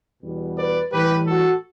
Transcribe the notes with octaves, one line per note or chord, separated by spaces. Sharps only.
E2 B2 G3
B4 D5
A2 E3 G3 G4 B4
F#4 A4